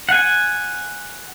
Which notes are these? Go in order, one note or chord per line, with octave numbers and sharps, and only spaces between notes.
F#5 G#5